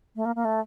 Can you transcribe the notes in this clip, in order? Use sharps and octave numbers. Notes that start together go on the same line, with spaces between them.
A3
A#3
A#3
A3